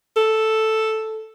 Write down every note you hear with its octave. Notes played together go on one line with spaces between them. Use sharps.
A4